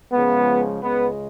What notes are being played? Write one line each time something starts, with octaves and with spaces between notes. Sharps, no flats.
C#2 C#3 F3 G#3 B3
C#2 C#3 G#3 B3